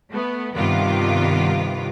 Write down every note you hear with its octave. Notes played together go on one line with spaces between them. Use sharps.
A3 B3
G2 C3 D#3 B3 F4 D6